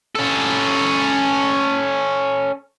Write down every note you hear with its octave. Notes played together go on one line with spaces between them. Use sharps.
C#4 A4